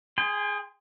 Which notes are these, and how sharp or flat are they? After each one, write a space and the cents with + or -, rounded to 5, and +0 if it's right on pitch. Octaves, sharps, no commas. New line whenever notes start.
G#4 +0 G5 +40 C6 -20